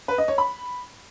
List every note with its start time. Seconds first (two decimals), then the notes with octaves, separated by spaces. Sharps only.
0.08 B4
0.18 D#5
0.28 C#5
0.38 B5